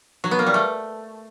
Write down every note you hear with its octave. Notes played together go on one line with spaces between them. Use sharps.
F#3
B3
A#3
G3
A3